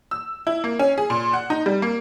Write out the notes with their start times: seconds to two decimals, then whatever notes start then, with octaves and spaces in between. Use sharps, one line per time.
0.11 E6
0.47 E4
0.64 A#3
0.79 C#4
0.98 G#4
1.10 A#2
1.33 F#5
1.50 D#4
1.66 G3
1.82 A#3